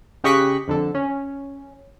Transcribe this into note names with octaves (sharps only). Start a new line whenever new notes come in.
C#3 G4 D#5 C#6 F#6 B6
F2 D3 A4
C#4